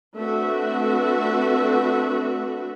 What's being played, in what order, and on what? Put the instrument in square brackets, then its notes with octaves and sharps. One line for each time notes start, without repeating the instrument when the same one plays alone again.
[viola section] A3 C4 D4 F#4 B4 E5